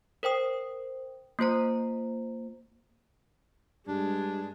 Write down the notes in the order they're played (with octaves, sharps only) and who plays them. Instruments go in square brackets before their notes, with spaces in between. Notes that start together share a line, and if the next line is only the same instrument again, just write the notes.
[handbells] A#4 C5 G5 D#6
A#3 F4 C5 A#5
[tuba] G2 [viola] G#3 [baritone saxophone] D4